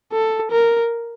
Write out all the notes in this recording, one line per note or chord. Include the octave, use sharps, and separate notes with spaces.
A4
A#4